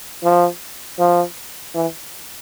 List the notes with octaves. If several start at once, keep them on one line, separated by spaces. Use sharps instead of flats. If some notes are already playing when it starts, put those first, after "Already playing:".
F3
F3
E3